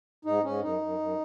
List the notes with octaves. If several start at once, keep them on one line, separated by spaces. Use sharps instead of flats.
G#2 D#4
G#2 C#4
F#2 D#4
F#2
F#2